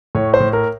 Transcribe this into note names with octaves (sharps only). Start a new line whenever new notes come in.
A2 C#5
C5
A2
A#4